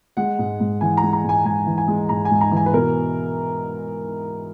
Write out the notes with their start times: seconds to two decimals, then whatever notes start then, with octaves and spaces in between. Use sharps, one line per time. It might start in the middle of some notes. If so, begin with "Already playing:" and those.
0.17 G#3 F#5
0.39 G#2
0.60 G#2
0.81 E3 G#5
0.97 A#5
1.03 G#3
1.13 A#5
1.24 G#2 G#5
1.45 G#2 G#5
1.66 E3
1.78 G#5
1.88 G#3
2.09 G#2 A#5
2.25 G#5
2.31 G#2
2.41 A#5
2.51 E3
2.57 G#5
2.66 B4
2.73 B2 A#4